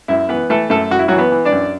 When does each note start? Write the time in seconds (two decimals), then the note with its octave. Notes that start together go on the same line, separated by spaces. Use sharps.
0.08 F#2 E4 E5
0.29 E3 B3 B4
0.50 E3 A3 A4
0.70 F#2 A3 A4
0.90 F#2 F#4
0.99 E4
1.08 E3 F#3 F#4
1.18 B3 B4
1.32 E3
1.45 D4 D5
1.52 F#2